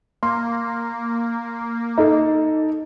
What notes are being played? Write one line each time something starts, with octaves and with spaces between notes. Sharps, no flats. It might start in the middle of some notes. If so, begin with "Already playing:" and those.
A#3 C6
D#4 A4